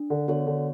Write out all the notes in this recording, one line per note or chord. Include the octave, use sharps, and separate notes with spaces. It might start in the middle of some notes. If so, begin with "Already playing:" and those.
Already playing: D4
D3
D3 B3 F#4 C#5
D3